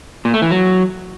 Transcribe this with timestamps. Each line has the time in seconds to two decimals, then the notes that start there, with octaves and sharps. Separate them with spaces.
0.25 A#2
0.34 A3
0.42 E3
0.51 F#3